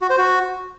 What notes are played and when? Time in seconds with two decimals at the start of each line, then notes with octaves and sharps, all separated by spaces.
0.02 F#4
0.10 C5
0.18 F#4